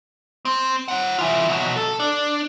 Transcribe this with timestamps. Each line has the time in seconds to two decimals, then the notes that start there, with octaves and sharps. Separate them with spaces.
0.45 C4
0.88 D#4 F#5
1.19 E3 F4
1.49 B2 F#3
1.76 A4
2.00 D4